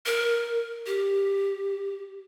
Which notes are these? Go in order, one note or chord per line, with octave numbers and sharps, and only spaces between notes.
A#4
G4